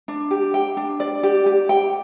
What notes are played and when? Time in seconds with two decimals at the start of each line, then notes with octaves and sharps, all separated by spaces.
0.08 D4
0.31 G4
0.54 G5
0.77 D4
1.00 D5
1.23 G4
1.46 G4
1.69 G5